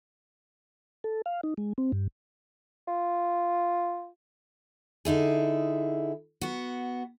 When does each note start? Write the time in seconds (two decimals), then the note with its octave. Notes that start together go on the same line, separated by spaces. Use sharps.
1.04 A4
1.26 F5
1.43 D#4
1.58 G#3
1.78 C4
1.92 G2
2.88 F4
5.05 D3 D#4 E4 G#4
6.41 B3 F#4